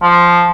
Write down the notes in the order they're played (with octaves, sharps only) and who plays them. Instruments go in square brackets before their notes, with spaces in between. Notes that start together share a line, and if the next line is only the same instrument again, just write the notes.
[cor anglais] F3